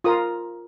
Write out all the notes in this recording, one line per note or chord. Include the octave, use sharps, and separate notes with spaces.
F4 A#4 D#6